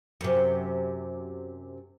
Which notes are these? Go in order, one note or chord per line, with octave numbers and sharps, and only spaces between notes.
F#2 C3